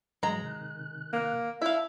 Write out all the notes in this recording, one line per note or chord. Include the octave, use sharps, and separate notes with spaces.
G#2 E3 F#3 G#3 A#5
C3 D#3 F#6
A#3
E4 E5 F5 A5